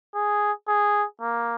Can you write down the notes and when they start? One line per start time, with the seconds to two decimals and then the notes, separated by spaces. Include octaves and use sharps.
0.15 G#4
0.68 G#4
1.21 A#3